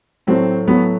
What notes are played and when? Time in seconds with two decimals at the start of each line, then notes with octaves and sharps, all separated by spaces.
0.27 A2 F#3 A3 C4
0.68 A2 F#3 A3 B3